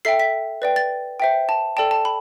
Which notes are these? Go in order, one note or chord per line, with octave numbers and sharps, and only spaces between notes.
A4 E5 G5 C7
B6
B4 D5 G5
A6
C5 E5 G5
A5
A4 D5 G5 A5
A5
B5